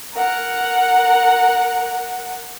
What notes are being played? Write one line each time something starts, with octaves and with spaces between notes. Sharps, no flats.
A#4 F#5